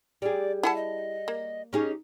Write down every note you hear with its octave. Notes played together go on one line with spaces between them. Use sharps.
G3 G#4 D5
E4 F#5 G#5 A5
D#5
A#3
C#4 D#4 G4 G#4